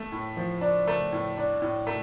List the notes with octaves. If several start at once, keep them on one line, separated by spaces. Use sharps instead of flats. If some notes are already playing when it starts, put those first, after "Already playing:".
Already playing: A3
A2
F3
D4
A3
A2
D4
A2
A3